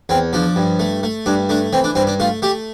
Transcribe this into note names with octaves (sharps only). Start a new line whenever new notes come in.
E2 C4
F3 D4
G2
A3
A3
G2 D4
A3 D4
E3 C4
D4
G2 C4
D4
A3 F4
A3 G4